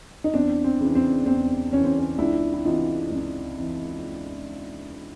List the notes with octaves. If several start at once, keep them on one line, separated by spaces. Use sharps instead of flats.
D#4
E2 C4 D4
C4
C#3 E3
C4
E2 C4
C#3 E3 C#4
C4
C#4
C#2 D4 E4
E4
C3 E3 D#4 F4
C#2
C3 E3